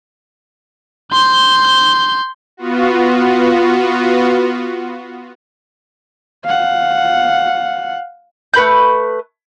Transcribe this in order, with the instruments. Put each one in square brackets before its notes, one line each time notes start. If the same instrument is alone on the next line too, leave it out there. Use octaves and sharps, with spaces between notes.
[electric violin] C6 G6
[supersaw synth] B3 F4 F#4
[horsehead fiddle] F5 F#5
[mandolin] A3 B4 B5 G6